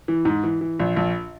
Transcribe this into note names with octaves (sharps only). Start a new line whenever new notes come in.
E3
G#2
E3
E3
A#1
A#1